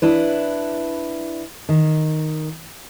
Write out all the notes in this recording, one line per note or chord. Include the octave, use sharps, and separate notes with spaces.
D4 E4 B4
D#3